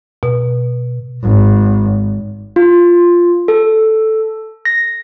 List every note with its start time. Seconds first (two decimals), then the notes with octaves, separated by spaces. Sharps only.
0.23 B2
1.23 G#1
2.56 F4
3.48 A4
4.65 A#6